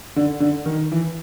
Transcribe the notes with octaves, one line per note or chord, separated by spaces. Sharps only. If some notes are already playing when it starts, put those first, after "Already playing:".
D3
D3
D#3
E3